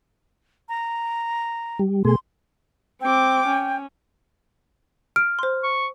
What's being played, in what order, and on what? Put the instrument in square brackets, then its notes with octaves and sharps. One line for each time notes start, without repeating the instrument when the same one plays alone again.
[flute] A#5
[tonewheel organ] G3
[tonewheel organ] B2 A3 G#4 [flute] C6
[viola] C4 D6 [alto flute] G5
[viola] C#4
[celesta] F6 [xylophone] D7
[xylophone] C5 C6
[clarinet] C#6